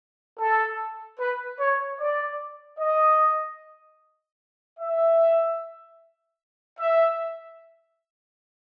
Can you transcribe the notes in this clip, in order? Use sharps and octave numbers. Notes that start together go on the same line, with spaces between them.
A4
B4
C#5
D5
D#5
E5
E5